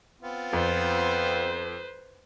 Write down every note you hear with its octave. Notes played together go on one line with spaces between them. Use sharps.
B3 C4 F4
F2 B4 C5